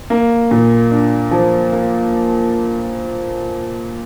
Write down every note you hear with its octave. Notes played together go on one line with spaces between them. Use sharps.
A#3
A#2
D4
F3
A#3